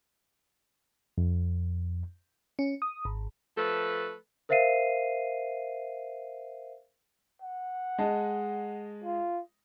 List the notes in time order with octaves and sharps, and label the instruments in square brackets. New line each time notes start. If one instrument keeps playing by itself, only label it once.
[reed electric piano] F2
[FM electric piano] C#4
D#6
G#1
[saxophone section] F3 A3 A4 B4
[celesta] A#4 C5 E5 F5 C7 D#7
[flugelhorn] F#5
[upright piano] G#3 D#5 A5
[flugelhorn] F4